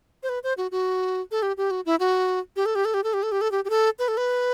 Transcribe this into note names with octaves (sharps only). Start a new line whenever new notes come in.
C5
B4
C5
F#4
F#4
A4
G4
G4
F#4
E4
F#4
G4
A4
G4
A4
G4
A4
G4
A4
G4
A4
G4
G4
A4
B4
A4
B4